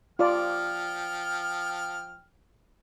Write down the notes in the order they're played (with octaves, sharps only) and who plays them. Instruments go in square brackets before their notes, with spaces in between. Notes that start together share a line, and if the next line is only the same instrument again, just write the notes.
[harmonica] F3 G5 F6 [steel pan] F4 D5